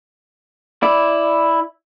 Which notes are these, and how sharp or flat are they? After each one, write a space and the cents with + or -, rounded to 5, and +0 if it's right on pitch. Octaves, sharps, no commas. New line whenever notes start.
E4 +0 D5 +0